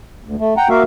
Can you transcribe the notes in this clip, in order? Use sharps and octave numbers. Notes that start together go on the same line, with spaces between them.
D2
A3
F#5 G5 A#5
A#3 F#4 A#4 E5 F5